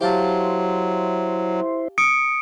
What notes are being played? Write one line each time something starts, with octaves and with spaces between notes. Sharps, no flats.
F#3 E4 G4 C5 F5 A5
D#6 C#7 D7